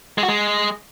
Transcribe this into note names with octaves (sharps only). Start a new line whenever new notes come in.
G#3
F#4
G#3